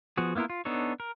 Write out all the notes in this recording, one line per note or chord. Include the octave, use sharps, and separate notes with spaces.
F3 B3 F#4 G#4
A#3 B3 E4 F4 A#4
F4
B3 D4 D#4 A4 C#5
A#4